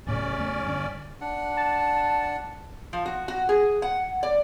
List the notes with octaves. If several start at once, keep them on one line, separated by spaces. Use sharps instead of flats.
D1 A2 C#3 C#4 D5
E2 C#3 A3
G2 D3
D4 F#5
A5
F3
F#4
F#4
G#4
F#5
D5